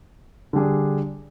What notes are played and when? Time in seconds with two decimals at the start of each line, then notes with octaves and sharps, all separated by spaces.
0.53 D3 G3 D4 G#4